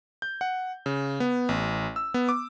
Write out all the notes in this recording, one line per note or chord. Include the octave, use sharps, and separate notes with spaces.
G6
F#5
C#3
B3
A1
E6
B3
D6